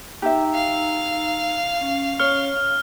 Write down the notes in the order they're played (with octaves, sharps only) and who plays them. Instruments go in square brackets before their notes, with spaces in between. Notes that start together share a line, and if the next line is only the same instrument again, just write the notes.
[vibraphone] D#4 A#5 E6 [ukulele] G4 E5
[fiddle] F5
[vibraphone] C#4
[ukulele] C#5 [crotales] F6